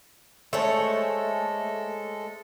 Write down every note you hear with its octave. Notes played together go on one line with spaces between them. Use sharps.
G#3 A3 A4 C5 C#5 E5 G#5 A5